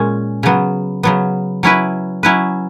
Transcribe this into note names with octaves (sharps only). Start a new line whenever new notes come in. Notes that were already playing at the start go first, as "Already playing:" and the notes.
Already playing: A#2 G#3 C#4
C#3 F#3 B3
C#3 F#3 B3
F#3 C#4 E4 B4
F#3 C#4 E4 B4